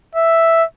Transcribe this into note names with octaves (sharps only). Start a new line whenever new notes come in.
E5